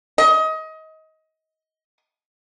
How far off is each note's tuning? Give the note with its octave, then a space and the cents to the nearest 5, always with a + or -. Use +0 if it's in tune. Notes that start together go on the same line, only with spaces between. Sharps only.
D#5 +25